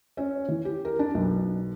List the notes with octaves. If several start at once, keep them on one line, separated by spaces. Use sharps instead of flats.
C#4
E3
G4
A#4
D4
B1